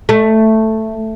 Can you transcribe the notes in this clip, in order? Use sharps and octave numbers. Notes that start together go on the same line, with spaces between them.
A3